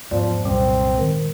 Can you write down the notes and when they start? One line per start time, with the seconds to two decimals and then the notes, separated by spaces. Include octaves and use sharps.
0.11 E2 G#2 F3 B3 D5
0.45 C2 F#2 A#2 G3 C4
0.98 D#3 G#3 A#4